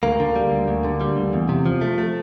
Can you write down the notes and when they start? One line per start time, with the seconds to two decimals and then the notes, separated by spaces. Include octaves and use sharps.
0.03 D2 A#3
0.20 D3
0.36 G3
0.52 D2
0.68 D2
0.85 D3
1.01 G3
1.17 D2
1.33 E2
1.49 C3
1.66 F3
1.81 A3
1.98 A3